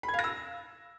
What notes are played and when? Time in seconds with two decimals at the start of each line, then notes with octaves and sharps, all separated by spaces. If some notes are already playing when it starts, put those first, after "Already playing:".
0.03 B5
0.08 G#6
0.14 F5
0.19 A#6
0.24 E6